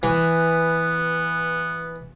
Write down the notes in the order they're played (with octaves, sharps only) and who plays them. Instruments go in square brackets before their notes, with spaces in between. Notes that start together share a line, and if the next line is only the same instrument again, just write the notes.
[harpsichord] E3 [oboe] B3